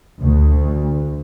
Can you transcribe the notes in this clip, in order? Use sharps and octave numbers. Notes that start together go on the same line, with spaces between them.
D2